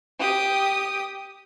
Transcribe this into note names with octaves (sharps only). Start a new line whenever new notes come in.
G4 D#6